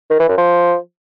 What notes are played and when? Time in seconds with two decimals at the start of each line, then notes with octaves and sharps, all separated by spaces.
0.10 D#3
0.19 E3
0.28 F#2
0.37 F3